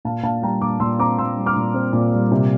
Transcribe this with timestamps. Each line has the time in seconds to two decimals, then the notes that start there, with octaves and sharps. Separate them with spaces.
0.05 A#2 F5 A5
0.23 A#2 F5 A5
0.42 G3 G5 A#5
0.61 A#2 A#5 D6
0.80 A#2 C6 E6
0.99 C4 A#5 D6
1.18 A#2 C6 E6
1.37 G3
1.46 D6 F6
1.56 A#2
1.74 C4
1.93 A#2
2.12 G3
2.31 C3